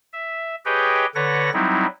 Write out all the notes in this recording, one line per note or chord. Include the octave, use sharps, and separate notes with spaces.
E5
G4 G#4 B4 C#5 D#5 G5
D3 A4 B4 C#5 F#5 A#6
F#3 G3 C4 D#4 E4